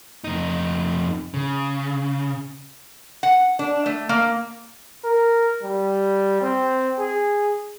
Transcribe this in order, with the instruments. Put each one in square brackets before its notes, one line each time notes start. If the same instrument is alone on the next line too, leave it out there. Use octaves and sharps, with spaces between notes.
[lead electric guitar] F2 D#4
C#3
[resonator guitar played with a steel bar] F#5
D4
A3
A#3
[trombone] A#4
G3
C4
G#4